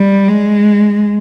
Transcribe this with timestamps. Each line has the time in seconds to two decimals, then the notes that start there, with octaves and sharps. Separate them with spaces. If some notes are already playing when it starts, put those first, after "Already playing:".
Already playing: G3
0.27 G#3